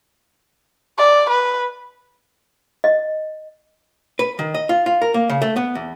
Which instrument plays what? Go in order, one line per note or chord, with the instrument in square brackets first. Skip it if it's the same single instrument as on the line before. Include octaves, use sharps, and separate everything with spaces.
[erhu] D5
B4
[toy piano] D#5
[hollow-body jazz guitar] B4
D#3
D#5
F4
F4
A#4
A#3
C#3
A3
B3
E2